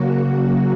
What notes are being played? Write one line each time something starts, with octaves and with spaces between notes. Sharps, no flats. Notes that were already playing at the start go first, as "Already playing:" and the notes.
Already playing: C#3 F#3 A#3 F#4
F#4